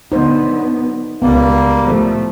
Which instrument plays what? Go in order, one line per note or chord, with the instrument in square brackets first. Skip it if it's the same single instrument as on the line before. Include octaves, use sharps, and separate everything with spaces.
[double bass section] D3 F#3 B3 [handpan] D#4 C5
[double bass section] C#2 [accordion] G3 A#3 [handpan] B3
[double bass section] A2 F3 A3